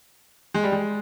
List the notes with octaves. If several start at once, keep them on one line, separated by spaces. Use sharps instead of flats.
G#3
G3
G#3